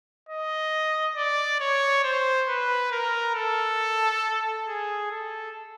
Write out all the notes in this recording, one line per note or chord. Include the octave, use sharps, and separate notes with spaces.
D#5
D5
C#5
C5
B4
A#4
A4
G#4
A4